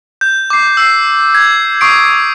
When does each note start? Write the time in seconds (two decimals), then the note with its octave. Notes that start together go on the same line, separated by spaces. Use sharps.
0.21 G6
0.50 D6 C7
0.77 E6 C7
1.35 G#6
1.81 C#6 D#6 C7 D7